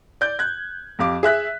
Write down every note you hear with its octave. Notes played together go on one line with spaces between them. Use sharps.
D5 G6
F#6 G#6
F2 G4 F5 D6
G#4 E5 F#6 B6